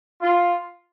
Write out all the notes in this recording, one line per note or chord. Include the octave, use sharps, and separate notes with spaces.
F4